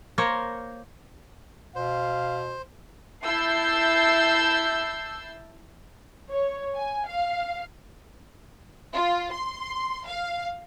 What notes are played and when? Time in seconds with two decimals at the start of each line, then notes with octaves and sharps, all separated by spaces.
0.18 A#3 A#4 C5 C#5
1.76 B2 C5 F5
3.24 E4 A5 E6 G6 C7
6.31 C#5
6.76 G#5
7.08 F5
8.93 F4
9.32 C6
10.06 F5